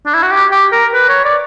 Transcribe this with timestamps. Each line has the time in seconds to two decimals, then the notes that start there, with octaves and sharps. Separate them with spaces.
0.06 D4
0.14 E4
0.23 F#4
0.31 G4
0.51 G4
0.72 A#4
0.93 B4
1.09 C#5
1.24 D5